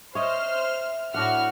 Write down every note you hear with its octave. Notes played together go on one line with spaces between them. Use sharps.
C5 C#5 D#5 E5 F6
A2 D4 E4 F#4 F#5 F6